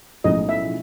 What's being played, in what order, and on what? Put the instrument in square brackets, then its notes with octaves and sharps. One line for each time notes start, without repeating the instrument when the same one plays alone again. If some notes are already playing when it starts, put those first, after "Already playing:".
[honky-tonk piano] B1 A2 F3 G#3 C#4 [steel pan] D#5
[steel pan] E5